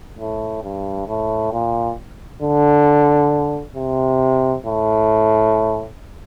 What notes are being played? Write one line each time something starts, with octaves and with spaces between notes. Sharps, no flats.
A2
G2
A2
A#2
D3
C3
A2